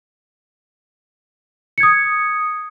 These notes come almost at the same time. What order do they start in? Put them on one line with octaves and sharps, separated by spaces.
C#7 G#6 D#6